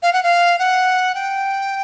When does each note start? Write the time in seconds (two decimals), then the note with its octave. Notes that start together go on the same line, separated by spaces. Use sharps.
0.03 F5
0.13 F#5
0.23 F5
0.59 F#5
1.15 G5